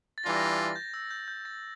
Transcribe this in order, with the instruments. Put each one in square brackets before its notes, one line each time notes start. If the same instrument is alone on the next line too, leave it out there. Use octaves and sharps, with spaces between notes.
[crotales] A6
[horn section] E3 G3 D4 F4 [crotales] A#6
[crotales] A#6
A6
A6
G6
E6
G6
G6
A6